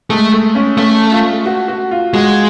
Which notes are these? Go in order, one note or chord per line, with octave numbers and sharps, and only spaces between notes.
G#3 A3
A3
C#4
A3 C#4
F4
F#4
F#4
F4
G#3 F#4